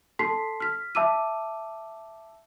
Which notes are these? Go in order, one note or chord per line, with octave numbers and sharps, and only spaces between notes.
A4 A5 C6 B6 C7
F6 B6
E5 A5 D6 E6 D#7